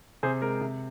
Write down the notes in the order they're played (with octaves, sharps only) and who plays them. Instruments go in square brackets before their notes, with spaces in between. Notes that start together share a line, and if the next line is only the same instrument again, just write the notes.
[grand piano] C3 G#4 C5
G#3 A#4
C3